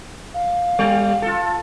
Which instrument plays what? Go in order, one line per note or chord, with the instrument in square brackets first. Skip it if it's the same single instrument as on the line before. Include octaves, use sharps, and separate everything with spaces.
[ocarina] F5
[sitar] G3
F4 A4